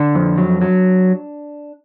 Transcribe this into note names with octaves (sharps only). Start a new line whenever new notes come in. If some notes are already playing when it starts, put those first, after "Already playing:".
Already playing: D3 D4
F2
F#3
F#3